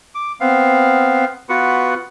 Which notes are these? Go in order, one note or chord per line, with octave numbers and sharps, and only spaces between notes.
D6
B3 C4 F5
B3 F4 F#4 B4 F#5